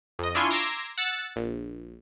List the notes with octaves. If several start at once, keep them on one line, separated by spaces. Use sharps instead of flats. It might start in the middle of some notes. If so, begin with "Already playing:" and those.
F2 D#5
D4 E4 F4 G#5 C6 C#6
A#5 C6 D6 E6 G#6 A#6
F#5 E6 A6
A#1